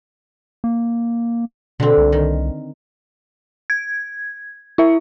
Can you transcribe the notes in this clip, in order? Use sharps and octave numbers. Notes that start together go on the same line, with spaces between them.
A#3
B2 D3 C4
C2
D#3
G#6
E4 E5